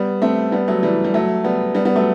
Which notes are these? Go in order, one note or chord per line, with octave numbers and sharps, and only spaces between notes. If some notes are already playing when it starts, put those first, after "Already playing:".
Already playing: G3 B3
A3 C4
G3 B3
F#3 A3
E3 G3
G3
F#3 A3
G3 B3
G3 B3
G3 B3
F#3 A3